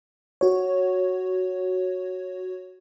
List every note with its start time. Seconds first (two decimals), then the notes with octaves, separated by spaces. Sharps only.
0.41 F#4 C#5